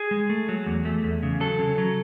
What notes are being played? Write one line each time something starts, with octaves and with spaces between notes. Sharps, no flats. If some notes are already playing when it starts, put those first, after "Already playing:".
Already playing: G#4
G#3
A3
F#3
E2
A3
E2
C#3
F#3 A4
C#3
F#3